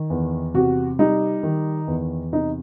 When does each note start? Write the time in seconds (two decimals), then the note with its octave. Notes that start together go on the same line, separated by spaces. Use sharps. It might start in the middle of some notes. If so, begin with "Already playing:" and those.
Already playing: D#3
0.10 E2
0.54 C3 F#4
0.99 G3 D#4
1.43 D#3
1.87 E2
2.32 C3 D#4